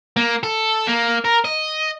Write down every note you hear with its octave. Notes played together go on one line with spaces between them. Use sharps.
A#3
A4
A#3
A#4
D#5